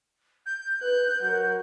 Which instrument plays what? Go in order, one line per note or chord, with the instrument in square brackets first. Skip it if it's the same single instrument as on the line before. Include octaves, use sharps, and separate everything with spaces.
[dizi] G6
[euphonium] B4 [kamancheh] F#6
[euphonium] F#3 [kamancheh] F#4 A#4